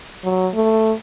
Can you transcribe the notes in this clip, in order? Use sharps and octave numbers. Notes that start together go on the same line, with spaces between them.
F#3
A3